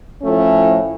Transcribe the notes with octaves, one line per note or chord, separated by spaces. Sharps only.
A2 F3 A3 C#4